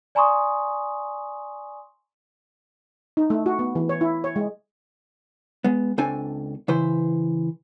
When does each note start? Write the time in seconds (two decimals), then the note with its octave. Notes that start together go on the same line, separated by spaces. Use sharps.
0.15 D5 G#5 A#5 C6 C#6 D#6
3.17 D#4
3.30 A3
3.46 F#4
3.59 B3
3.75 E3
3.89 C#5
4.01 E4
4.24 C#5
4.36 G#3
5.64 G#3 B3
5.98 C#2 C4 D4 A4 G#5
6.68 C#3 E3 B4 C5